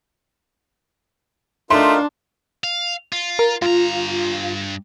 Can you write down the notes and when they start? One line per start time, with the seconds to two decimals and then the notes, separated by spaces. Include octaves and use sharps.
1.70 A3 D4 D#4 F4 A#4 C6
2.64 F5
3.12 F4
3.39 A#4
3.62 G2 F4 A#5